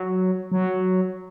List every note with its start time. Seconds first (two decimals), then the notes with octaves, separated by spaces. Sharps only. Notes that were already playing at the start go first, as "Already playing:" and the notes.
Already playing: F#3
0.51 F#3